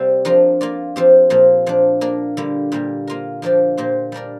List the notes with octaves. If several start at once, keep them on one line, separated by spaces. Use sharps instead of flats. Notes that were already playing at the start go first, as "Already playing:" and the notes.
Already playing: C3 G3 A#3 C4
F3 D4 F4 A#4
A#3 F4 D5
F3 C4 G4
A#2 F3 A#3
A#2 F3 D4
A#3 D4 A#4 D5
D3 G3 A#3 G4
A#2 G3 A#3
A#3 F4 A#4
F3 A#3 D4 G4 D5
A#2 A#3 G4 C5
G3 D4 A#4 D5